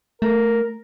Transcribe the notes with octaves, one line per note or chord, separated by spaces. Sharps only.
A3 A#4